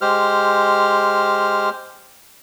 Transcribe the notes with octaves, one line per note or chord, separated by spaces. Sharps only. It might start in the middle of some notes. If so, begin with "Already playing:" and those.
G#3 G4 C5 F6